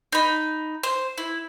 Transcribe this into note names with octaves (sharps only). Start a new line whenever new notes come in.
D#4 B5
C5
E4